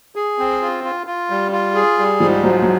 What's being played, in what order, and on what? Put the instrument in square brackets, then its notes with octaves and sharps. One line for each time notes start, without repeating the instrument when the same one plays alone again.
[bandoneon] G#4
C4
F4
F4
F4
G3
F4
G#4
G3
[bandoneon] G#2 [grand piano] F3
[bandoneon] F3 [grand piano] F#3
[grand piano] F#3